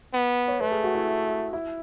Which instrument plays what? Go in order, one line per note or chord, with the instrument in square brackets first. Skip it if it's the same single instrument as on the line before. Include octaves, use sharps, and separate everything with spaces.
[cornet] B3
[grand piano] C#5
[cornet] A3 [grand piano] B4
[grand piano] G#4
F#4
E4
E4